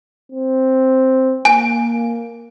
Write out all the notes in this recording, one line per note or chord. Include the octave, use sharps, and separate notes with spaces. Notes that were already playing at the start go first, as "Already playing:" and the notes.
C4
A#3 G#5